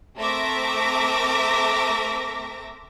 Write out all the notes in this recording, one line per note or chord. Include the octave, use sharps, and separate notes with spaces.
A3 C4 A#4 E5 D6 A#6